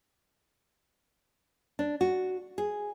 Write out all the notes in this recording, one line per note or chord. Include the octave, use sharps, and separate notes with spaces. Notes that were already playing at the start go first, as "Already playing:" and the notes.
D4
F#4
G#4